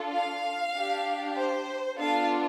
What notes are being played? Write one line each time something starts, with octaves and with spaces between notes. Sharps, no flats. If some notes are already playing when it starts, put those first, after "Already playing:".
Already playing: D4 F4 A4
F5
D4 G4
C5
B3 D4 F4 A4 F5